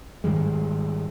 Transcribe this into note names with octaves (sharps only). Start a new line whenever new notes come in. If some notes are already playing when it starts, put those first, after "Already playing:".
G#2 D#3 G3 G#3